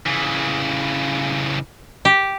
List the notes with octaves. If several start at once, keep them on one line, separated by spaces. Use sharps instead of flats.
C#3 E3
G4